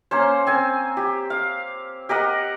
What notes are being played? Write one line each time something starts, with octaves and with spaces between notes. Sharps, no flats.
A#3 C#4 C5
C4 G#5
G4
F5
G4 A#4 D#5 F#5